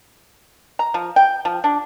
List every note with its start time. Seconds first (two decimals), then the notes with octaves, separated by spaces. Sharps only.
0.79 A#5
0.94 F3
1.16 G5
1.45 F3
1.64 D4